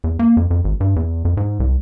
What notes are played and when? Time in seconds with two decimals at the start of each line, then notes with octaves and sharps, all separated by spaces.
0.04 E2
0.19 A#3
0.37 F2
0.50 F2
0.64 G#1
0.80 G2
0.96 E2
1.25 F2
1.37 G#2
1.60 C2